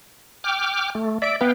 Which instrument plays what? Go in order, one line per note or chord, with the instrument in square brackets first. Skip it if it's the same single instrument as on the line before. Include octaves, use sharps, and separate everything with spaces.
[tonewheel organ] G5 D6 F6
A3
[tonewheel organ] D5 [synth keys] E5 B6 D7
[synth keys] B3 B4 [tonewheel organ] F5 G5